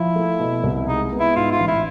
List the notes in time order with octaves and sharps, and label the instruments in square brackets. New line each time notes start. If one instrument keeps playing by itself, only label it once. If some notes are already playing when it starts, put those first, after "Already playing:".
Already playing: [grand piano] F3 [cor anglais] E4
[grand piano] A3
B2
C2
[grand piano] G#3 [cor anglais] D#4
[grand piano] B3
[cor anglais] E4
[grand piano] G#2 [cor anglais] F4
[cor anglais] F4
[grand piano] A1
[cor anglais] E4